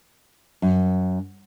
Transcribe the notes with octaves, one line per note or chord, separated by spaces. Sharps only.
F#2